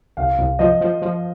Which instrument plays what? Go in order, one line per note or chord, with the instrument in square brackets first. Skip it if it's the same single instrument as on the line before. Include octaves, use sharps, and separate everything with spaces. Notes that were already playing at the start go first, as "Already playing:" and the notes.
[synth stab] C2 [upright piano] F5
[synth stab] C2
[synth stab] F3 [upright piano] D#5
[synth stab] F3
F3